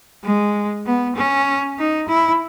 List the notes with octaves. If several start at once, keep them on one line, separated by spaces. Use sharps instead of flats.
G#3
B3
C#4
D#4
E4